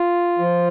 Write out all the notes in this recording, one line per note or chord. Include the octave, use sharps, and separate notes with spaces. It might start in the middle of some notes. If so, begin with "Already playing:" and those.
Already playing: F4
F3